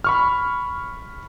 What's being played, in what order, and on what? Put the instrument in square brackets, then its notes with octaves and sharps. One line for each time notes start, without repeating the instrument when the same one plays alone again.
[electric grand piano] B5 C#6 F6